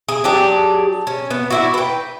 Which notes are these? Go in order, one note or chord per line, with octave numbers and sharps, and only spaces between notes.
G#4
F#3 D4 G4 G#4
C#4
B3
D4 E4 F#4
B4 G5